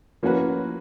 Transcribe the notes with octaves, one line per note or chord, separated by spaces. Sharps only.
F3 A#3 C#4 F#4 B4